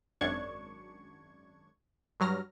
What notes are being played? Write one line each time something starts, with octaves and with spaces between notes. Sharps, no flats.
G#1 F#2 D4 C#6 G#6
G2 F#3 F6 A#6